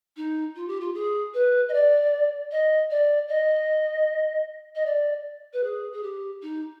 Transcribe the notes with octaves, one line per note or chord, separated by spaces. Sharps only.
D#4
F4
G4
F4
G#4
B4
D#5
D5
D#5
D5
D#5
D#5
D5
B4
G#4
G#4
G4
D#4